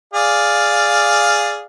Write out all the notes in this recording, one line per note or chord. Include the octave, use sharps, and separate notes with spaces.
G#4 D5 F5